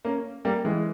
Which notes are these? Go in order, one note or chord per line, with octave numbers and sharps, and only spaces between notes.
A#3 C#4
G3 A#3
E3 G#3